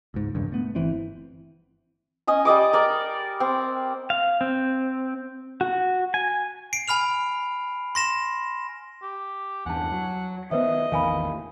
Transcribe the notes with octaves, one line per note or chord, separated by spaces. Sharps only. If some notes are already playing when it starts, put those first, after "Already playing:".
C#2 G#2
E1 C#2 G2
A3 B3
G1 E3 C4
C#4 D#5 G#5
G3 D5 D#5 D6
A#4 D5
C4
F5
C4
F#4
G#5
C7 D7
G#5 B5 F6 F7
C6 A#6 E7
G4
E2 G2 F#5 G#5 A5
F#3
D#3 B3 B4 C5 D#5 E5
A1 E2 D#3 F5 G#5 B5